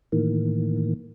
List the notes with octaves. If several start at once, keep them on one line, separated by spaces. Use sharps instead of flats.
A2 D#3 E3 A#3